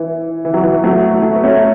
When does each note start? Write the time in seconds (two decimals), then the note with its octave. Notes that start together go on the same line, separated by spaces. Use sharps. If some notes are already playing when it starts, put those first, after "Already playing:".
Already playing: E3
0.45 E3
0.54 F#3
0.63 E3
0.84 F#3 A3
1.22 A3
1.34 B3
1.43 A3 C#4